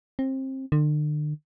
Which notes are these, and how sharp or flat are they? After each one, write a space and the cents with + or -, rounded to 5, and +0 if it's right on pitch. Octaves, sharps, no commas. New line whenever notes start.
C4 +25
D3 +40